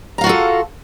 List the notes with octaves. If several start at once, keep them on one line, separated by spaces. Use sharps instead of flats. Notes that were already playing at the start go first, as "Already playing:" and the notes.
F4 F#4 A4 F5 A#5